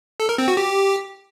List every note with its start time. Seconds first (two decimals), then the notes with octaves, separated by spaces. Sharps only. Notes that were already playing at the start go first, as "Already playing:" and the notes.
0.20 A4
0.29 A#4
0.38 C4
0.48 F#4
0.57 G4